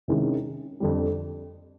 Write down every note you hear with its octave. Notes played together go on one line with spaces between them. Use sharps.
C3 D#3 G#3 C#4 E4
F2 D3 G3